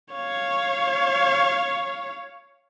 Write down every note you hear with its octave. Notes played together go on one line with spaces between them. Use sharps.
C#5 F5